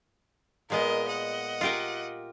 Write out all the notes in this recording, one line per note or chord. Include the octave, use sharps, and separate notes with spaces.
A#2 G#3 B3 A#4 D#5
D#5 F#5
F4 G4 A#4